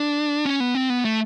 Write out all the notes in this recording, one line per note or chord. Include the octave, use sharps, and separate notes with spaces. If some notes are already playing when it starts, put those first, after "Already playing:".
Already playing: D4
C#4
B3
C4
B3
A3